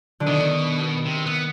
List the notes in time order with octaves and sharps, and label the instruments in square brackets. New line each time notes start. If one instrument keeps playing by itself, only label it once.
[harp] D3
[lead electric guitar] B2 [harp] D#3
[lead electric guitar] C3
B3